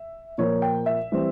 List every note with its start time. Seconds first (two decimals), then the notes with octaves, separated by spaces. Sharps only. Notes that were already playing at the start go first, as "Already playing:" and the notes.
Already playing: E5
0.38 A#2 F3 A#3 C#5
0.62 G5
0.86 E5
1.12 E3 G3 C4